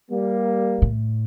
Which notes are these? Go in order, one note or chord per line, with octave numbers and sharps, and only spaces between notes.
G3 A#3
A2